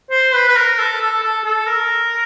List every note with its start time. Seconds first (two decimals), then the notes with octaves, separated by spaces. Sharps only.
0.11 C5
0.34 B4
0.48 B4
0.56 A#4
0.79 A4
1.01 A4
1.23 A4
1.44 A4
1.67 A#4